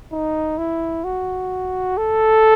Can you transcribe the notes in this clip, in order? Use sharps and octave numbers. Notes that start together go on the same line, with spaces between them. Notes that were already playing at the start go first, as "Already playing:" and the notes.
D#4
E4
F#4
A4